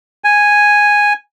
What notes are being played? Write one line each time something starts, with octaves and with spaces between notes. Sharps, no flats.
G#5